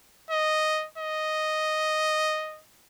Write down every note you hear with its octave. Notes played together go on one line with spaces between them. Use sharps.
D#5
D#5